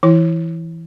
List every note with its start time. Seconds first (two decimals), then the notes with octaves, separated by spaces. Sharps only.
0.03 E3 E4